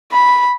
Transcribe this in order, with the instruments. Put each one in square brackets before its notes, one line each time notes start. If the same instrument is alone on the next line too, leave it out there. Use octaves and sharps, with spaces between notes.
[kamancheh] B5